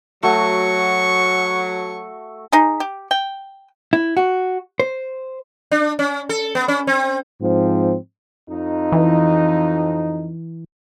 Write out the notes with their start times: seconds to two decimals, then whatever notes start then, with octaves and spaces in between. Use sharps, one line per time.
0.23 F#3 A3 F#4 C#6
2.52 D#4 G#4
2.80 G4
3.11 G5
3.93 E4
4.17 F#4
4.80 C5
5.71 D4
5.99 C#4
6.29 A4
6.55 B3
6.68 C#4
6.87 C4
7.42 G#2 F3 C4
8.48 F2 D#4
8.92 E3